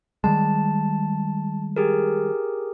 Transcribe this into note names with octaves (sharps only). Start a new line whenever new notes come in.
D#3 G3 G#3 A5
G4 G#4 A#4